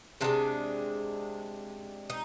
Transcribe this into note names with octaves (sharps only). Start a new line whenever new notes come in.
C3 E3 G#3 D4
D#4